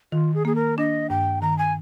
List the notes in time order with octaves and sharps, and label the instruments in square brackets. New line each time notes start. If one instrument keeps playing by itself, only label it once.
[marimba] D#3 [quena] F4
[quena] G#4
[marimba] A#3 [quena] G#4
[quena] A#4
[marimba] D4 [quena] D#5
[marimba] G2 [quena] G5
[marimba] D#3 [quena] A#5
[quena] G#5